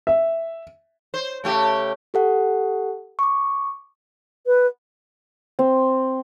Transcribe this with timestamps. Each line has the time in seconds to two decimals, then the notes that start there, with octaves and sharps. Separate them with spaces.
0.07 E5
1.14 C5
1.44 C#3 A3 G4
2.14 G4 A4 F#5
3.19 C#6 D6
4.46 B4
5.59 C4